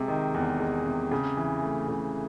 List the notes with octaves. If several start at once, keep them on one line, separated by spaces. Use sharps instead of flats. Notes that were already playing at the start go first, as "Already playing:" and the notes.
Already playing: C3 G#3
D#3
E2
G#3
C3
C#3
E3
A3
C#3